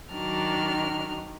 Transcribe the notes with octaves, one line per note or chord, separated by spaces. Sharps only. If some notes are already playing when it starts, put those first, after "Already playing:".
D#3 F#3 D4 F6